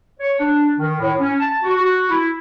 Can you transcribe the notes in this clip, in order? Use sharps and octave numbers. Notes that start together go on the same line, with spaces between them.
C#5
D4
D#3
A2
C#4
A5
F#4
F#4
E4